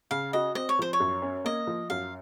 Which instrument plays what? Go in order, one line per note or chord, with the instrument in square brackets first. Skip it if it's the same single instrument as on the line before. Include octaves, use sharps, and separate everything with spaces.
[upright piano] C#3 [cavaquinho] F5
[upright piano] F#4 [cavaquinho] D#5
[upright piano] C4 [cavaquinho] D#5
[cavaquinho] C#5
[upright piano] F3 [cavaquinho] C5
[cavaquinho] C#5
[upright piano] F#2
C#4
[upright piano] A#3 [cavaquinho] D#5
[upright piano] F3
[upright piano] F#2 [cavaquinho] F5